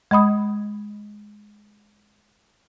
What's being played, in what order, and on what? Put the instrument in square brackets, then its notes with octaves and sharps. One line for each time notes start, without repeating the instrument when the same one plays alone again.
[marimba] G#3 D#5 B5 D#6